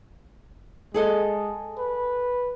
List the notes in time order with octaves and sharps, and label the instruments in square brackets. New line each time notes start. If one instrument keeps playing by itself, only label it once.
[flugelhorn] G#3 [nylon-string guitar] G#4 A4 D#5
[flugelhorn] B4